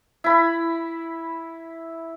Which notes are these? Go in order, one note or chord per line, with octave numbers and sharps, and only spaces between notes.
E4 B5